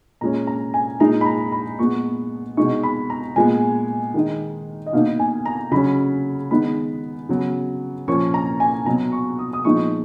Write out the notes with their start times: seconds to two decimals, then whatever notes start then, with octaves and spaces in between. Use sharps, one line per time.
0.21 A#2 G#3 C#4 A#5
0.47 A#5
0.74 G#5
1.00 A#2 G#3 D#4 A#5
1.21 B5
1.26 A#5
1.52 B5
1.79 A#2 G#3 B3 C#6
2.57 B2 G#3 D#4 C#6
2.83 B5
3.10 A#5
3.36 A#2 G#3 B3 G#5
4.14 D#3 G#3 D#4
4.86 D#5
4.93 B2 A#3 D#4 F5
5.19 G#5
5.46 A#5
5.72 C#3 F#3 C#4 B5
6.51 D#3 G#3 B3 D#4 B5
7.29 C#3 F#3 B3
8.08 A#2 F3 A#3 C#4 C#6
8.34 A#5
8.60 G#5
8.86 B2 F#3 B3 A#5
9.12 C#6
9.39 D#6
9.53 D#6
9.65 A#2 F3 G#3 B3 D#4 C#6